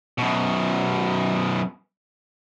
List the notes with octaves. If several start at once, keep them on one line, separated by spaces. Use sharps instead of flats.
F#2 B2